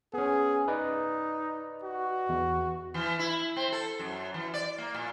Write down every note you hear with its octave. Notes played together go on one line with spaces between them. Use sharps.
B3 C#4 G#4
D#4 B4 D5 D#5
F#4
E2
E3
E4
C4
A4
F#2
E3
D5
A#3
A#2